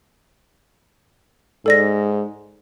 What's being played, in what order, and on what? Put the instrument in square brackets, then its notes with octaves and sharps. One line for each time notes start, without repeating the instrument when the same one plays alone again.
[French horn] G#2 [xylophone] A4 D5 A#6